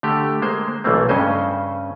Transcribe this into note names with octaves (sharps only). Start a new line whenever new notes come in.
D3 A3 G4
G#3 A#3 C5
B1 E3 A3 A#3 C4
G2 C#3 C#4 C5 D#5